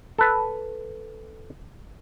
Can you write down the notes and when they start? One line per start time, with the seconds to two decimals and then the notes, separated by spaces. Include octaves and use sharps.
0.19 A4 B4